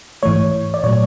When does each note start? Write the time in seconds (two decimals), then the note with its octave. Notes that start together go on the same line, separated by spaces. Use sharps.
0.23 G#2 E3 A3 C#5
0.74 D5
0.84 A#2 F#3 A3 C#5